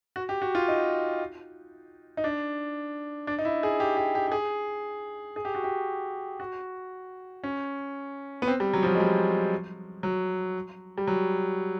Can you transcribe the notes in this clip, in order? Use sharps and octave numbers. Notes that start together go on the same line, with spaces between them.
F#4
G4
F#4
F4
D#4
D#4
D4
D4
D#4
E4
G#4
G4
G4
G4
G4
G#4
G#4
G4
F#4
G4
F#4
C#4
B3
C4
G3
F#3
F3
F#3
G#3
G3
F#3
G3
F#3